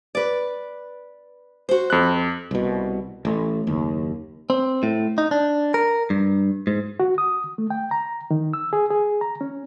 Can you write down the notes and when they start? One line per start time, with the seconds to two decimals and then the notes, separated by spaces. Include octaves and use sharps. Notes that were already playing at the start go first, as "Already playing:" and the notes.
0.15 B4 D5
1.69 F#4 C5
1.90 F2 F#6
2.51 C2 B2
3.25 A1 A3
3.67 F#1 D#2
4.50 C4
4.83 A2
5.18 D#4
5.31 D4
5.74 A#4
6.10 G2
6.67 G#2
7.00 F#4
7.18 D#6
7.58 A3
7.70 G5
7.91 A#5
8.31 D#3
8.53 E6
8.73 G#4
8.91 G#4
9.21 A#5
9.41 C#4